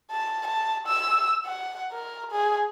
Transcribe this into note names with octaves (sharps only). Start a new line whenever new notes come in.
A5
A5
E6
F#5
A#4
G#4